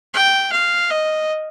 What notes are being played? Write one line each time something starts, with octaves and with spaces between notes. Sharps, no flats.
G5
F5
D#5